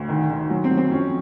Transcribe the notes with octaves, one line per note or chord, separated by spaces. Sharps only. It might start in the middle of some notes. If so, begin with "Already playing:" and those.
Already playing: D2
D#3
D#3
F#3
C4
F#3
C4
F2 C#4